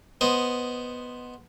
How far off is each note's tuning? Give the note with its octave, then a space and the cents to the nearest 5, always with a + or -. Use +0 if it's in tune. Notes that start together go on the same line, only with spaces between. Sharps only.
B3 +0 C5 +0 D#5 +0